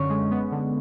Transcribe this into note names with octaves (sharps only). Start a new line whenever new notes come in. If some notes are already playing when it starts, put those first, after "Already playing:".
Already playing: F#2 D3 C#4 C#5
G#3
B3
D3